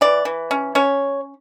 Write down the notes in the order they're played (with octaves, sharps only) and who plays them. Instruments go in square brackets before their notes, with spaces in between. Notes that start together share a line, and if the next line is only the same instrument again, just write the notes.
[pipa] E3 D5
E3
C#4
C#4 C#5